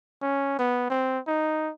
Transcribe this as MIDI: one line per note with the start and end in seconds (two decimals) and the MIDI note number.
0.22 0.58 61
0.59 0.85 59
0.90 1.19 60
1.27 1.71 63